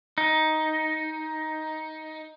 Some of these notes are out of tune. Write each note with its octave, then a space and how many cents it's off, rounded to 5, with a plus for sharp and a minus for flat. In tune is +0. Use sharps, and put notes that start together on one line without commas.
D#4 +10